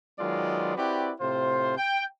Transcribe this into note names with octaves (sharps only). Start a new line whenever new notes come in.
D#3 F#3 G#3 B3 F4 D5
C4 E4 F#4 G4 B4 D5
A2 C3 F4 C5
G5